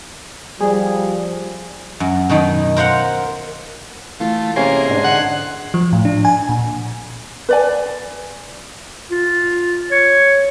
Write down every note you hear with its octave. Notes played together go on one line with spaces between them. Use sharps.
F3 G3 G#4
F#2
B2 D#3 D#4
A#4 C5 F5 F#5
E3 A3 F4
C3 A#3 C#4 G#4 C6
G#2 D4
D3 F#5
F3
A2
D4
G#5
A#2
B4 D5 G#5
F4
C#5